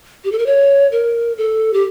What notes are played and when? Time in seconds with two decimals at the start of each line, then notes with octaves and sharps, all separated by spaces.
0.24 G4
0.32 A4
0.38 A#4
0.46 C#5
0.92 A#4
1.38 A4
1.73 G4